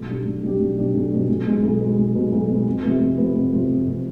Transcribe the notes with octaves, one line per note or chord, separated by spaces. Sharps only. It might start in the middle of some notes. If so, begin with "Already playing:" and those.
Already playing: B1
B2 G3 D4 G4
B1
B2 G3 D4 G4
B1
B2 G3 D4 G4
B1
B2 G3 D4 G4
B1
B2 G#3
B1
B2 G#3
B1
B2 G#3
B1
B2 G#3
F2
C3 F3 B3
F2
C3 F3 B3
F2
C3 F3 B3
F2
C3 F3 B3